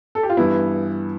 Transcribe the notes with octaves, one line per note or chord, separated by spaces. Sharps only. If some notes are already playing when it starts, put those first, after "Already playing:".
A4
G4
F4
G2 E3 B3 E4